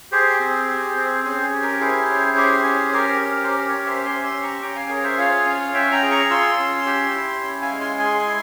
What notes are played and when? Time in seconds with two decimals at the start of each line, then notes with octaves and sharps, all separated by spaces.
0.12 G4 G#4 C5
0.40 C4
0.68 G4
0.96 C4
1.24 C#4 G#4 C5
1.42 G#4
1.53 G4
1.62 A#4
1.80 E4 G#4 C5
2.09 C#4
2.37 G4
2.64 C#4
2.93 G4 A#4
3.21 C#4
3.43 C5
3.49 G4 A#4
3.69 A#4 C#5
3.77 C#4
3.86 C5 E5
4.05 G4 G#5 C6
4.24 C6 E6
4.33 C#4
4.42 A#5 C#6
4.62 C#4 G5 A#5
4.76 F5 G#5
4.89 G#4 A#4 C#5
5.03 C5 E5
5.18 F4 C#5 F5
5.46 C#4
5.74 C#4 E5 G5
5.92 G5 A#5
6.03 G#4
6.11 A#5 C#6
6.30 F4 C6 E6
6.59 C#4
6.86 G4
7.15 E4
7.43 C#4
7.62 F5 G#5
7.71 G#3
7.80 G#5 C6
7.98 G#4 G#5 C6
8.27 E4